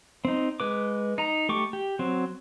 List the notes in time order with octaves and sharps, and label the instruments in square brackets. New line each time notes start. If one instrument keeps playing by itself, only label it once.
[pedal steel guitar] C4 D#4
G#3 B4 D6
D#4 A#5
A3 G4 C#6 D6
G4
F#3 C4